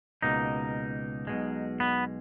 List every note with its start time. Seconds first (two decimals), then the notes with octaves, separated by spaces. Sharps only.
0.22 C#2 B2 A#3 D#4
1.27 B1 B2 G#3
1.80 B3